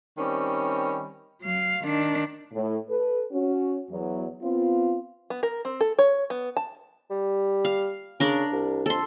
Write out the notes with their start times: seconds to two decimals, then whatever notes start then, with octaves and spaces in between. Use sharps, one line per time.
0.17 D#3 G3 C4 C#4
1.42 F#3 F5
1.84 D#3 D4
2.53 A2
2.89 A4 B4
3.31 C#4 F#4
3.89 E2 F#3
4.42 B3 C4 F4
5.30 B3
5.43 A#4
5.65 C4
5.81 A4
5.99 C#5
6.30 B3
6.57 A5
7.10 G3
7.65 F5
8.20 C#3 D4 A#4
8.52 C2
8.86 F2 A4 C6